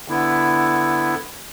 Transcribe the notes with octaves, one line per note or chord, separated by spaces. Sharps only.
D3 B3 E4